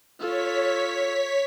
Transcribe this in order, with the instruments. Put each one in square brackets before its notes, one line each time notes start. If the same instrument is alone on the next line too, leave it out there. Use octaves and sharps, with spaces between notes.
[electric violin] F4 A4 [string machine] C#5 B6